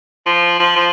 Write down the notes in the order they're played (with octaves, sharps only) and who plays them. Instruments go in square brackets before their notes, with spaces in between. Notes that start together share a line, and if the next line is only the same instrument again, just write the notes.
[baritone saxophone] F3
F3
F3